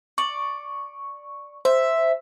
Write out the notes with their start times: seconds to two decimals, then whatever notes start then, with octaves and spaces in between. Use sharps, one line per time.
0.18 D5 C#6
1.65 C5 E5